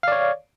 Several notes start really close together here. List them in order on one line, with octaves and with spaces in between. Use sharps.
F5 D5 C#5